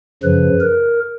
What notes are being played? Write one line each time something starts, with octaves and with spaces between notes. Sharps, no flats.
F#2 C#3 F3 B4
A#4